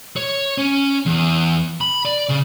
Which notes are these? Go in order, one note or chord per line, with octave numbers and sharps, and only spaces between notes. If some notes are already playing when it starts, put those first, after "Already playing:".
C#5
C#4
E2
B5
D5
C#3